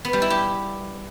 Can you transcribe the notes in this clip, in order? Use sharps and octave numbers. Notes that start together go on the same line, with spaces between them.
B3
G3
E4
G4